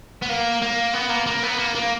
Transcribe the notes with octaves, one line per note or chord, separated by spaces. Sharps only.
B3
A#3
A#3
B3
A#3
A#3
B3
A#3
A#3